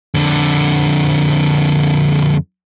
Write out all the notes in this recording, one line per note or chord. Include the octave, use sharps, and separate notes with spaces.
F2 D3